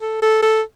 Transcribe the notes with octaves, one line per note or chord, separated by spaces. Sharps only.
A4
A4
A4